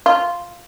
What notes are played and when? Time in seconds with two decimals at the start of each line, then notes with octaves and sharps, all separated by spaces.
0.06 F4